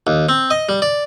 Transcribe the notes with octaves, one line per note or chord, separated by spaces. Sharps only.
D#2
C4
D#5
G3
D5